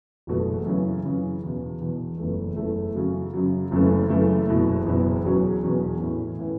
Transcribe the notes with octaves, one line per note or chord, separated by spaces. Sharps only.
F#1 E2 B2 A3 F#4
F#2 C#3 E3 C#4 E4
F#2 C#3 E3 C#4 E4
E1 E2 B2
E1 E2 B2
F#1 E2 E3 A3
F#1 E2 E3 A3
F#2 C#3 F#3
F#2 C#3 F#3
F#1 F#2 C#3 E3 A3
F#1 F#2 C#3 E3 A3
F#1 E2 B2 B3 E4
F#1 E2 B2 B3 E4
E1 E2 B2 F#3 C#4
E1 E2 B2 F#3 C#4
A2 E3 C#4 E4
A2 E3 C#4 E4